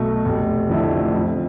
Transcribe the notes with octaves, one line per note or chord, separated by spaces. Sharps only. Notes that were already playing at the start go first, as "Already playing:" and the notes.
Already playing: B1 B2 A3
F1
F2 D3 A3 E4
F2